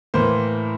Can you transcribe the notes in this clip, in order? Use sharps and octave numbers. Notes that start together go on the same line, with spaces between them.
A2 E3 A#3 C5